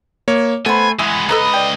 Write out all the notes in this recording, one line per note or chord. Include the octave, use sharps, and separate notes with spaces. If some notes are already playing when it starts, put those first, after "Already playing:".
A#3 C#5
A3 B3 C5 G#5
E3 G#3 B3 D#6
C#2 A4 B4 D#5 A#5
D5 G5